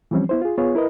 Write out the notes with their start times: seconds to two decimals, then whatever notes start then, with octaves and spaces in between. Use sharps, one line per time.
0.11 E3 F3 G3 C4 C#4
0.29 B3 E4 C5
0.42 F4 G#4
0.58 B3 F4 G#4 C#5
0.75 E4 A#4 B4 D#5